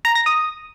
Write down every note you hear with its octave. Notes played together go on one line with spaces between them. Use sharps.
A#5
A#6
D#6